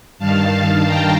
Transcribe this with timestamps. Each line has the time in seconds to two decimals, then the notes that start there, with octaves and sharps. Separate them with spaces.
0.19 G2 D#3 F5 A5
0.51 F5 A5
0.86 G5 A#5